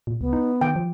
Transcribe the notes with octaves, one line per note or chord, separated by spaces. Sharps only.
A#2
C#2 B3
D#4
D#3 G5
F3